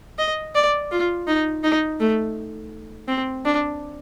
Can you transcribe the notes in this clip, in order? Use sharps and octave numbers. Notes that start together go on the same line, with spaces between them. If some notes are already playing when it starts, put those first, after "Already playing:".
D#5
D5
F4
D#4
D#4
A3
C4
D4